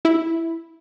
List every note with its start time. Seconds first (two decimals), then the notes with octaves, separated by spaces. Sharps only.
0.05 E4